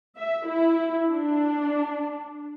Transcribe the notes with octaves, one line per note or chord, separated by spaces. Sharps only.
E5
E4
D4